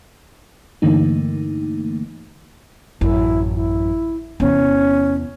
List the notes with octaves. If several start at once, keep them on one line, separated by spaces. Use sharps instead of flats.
G2 D3 E3 A3 A#3 D#4
A1 F#2 E4
E4
E2 C3 C#4